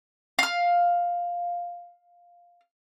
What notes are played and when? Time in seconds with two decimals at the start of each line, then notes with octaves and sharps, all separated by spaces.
0.39 F5 F6